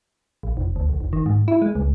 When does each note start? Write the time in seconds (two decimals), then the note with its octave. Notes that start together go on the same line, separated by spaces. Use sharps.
0.43 A#1
0.57 F1
0.76 D2
0.89 B1
1.01 F1
1.13 D#3
1.26 G#2
1.48 E4
1.62 G#3
1.75 C#2